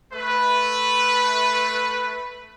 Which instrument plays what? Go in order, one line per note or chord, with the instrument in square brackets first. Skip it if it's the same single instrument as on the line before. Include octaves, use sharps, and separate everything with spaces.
[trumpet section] A3 B4